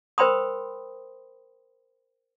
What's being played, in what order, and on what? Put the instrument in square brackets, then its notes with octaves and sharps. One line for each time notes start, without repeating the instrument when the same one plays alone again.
[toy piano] A#4 C5 G5 B5 C6 D#6